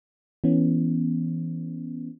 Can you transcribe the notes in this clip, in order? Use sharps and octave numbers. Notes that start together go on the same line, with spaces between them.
E3 B3 C#4